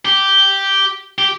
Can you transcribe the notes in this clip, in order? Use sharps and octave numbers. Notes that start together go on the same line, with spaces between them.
G4
G4